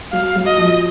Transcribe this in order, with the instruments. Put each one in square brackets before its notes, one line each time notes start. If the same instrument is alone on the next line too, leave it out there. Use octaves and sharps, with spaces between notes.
[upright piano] F#3 [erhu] F5
[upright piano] F#3
[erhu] D#5
[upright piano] F3